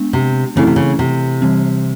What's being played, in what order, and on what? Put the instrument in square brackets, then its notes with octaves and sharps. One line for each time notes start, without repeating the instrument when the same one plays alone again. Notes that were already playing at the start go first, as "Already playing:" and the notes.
Already playing: [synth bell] G#3 B3 D4
[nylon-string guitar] C3
[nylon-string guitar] C#3 [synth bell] E3 A3 C4 E4 A4
[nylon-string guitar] C3
C#3
C3
[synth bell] E3 G3 C4